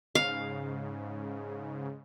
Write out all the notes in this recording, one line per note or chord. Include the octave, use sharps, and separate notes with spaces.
G#2 C#3 F5